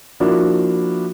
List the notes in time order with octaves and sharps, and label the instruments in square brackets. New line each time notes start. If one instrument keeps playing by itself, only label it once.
[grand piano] F3 A#3 D4 E4 F#4